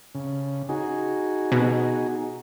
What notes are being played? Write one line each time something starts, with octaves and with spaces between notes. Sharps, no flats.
C#3
D#4 F#4 G#4
B2